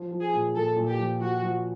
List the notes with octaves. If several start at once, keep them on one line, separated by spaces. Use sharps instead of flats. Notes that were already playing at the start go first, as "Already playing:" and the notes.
Already playing: F3
F3
G#4
A#2
A#2 A4
A#2
G4
F3
F3 F#4
F3